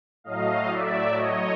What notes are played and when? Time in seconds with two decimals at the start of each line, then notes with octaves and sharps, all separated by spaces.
0.24 A2 F#3 A3 D#5 F5
0.68 D5 E5
1.12 C#5 D#5